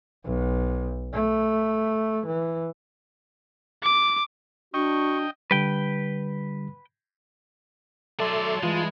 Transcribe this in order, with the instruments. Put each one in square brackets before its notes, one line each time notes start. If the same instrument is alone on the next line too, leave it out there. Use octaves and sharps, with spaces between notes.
[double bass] B1
A3
E3
[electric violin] D6
[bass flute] D4 [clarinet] F#4 [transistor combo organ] D#5 G5 [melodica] C#6
[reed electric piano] D3 G3 [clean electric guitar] B4 G5
[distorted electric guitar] F#3 D5 [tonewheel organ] A4 E5 [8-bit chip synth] A5 C6 A6
[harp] G2 E3 [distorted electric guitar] G#3 [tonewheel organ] F4